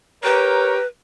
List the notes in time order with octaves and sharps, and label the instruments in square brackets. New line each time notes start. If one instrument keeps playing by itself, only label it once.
[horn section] G4 A#4 C#5 [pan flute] B4